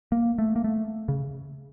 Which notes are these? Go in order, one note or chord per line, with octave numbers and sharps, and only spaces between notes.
A#3
A3
A#3
A3
C#3